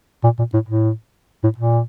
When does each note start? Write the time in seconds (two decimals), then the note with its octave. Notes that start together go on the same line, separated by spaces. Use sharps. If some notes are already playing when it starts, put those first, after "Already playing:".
0.24 A#2
0.39 A#2
0.54 A2
0.68 A2
1.43 A2
1.58 A#2